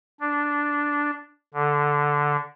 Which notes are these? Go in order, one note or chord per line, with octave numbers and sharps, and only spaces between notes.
D4
D3